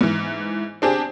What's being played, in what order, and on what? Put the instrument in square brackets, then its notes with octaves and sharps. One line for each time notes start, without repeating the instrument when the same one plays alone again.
[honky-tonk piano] G#2 E3
C4 D4 G4 G#4